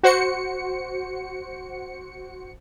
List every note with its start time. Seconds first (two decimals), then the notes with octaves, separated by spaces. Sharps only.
0.03 F#4 C5 C#7